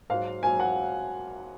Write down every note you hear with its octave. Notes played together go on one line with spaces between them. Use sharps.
G#2 F#3 F5
G#2 F#3 G#5
F#5